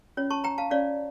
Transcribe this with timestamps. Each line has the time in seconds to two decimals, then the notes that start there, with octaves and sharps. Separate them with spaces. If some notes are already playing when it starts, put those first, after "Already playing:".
0.17 C#4 F4 C#5
0.30 A5 C#6
0.44 G5 A#5
0.58 F5 A5
0.70 C#4 F4 C#5 D5 F5